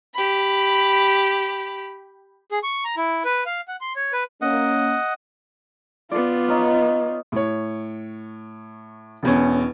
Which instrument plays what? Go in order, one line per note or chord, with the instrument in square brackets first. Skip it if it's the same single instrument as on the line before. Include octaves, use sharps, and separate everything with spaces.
[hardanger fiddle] G4 B5
[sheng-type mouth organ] G#4
C#6
A#5
E4
B4
F5
F#5
C6
C#5
B4
[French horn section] A#3 C#4 [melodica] D#5 F#5
[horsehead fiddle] B3 F4 [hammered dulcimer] D5
[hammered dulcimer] D#4 C#5 F5
[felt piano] A2 C#5
E1 E2 C#4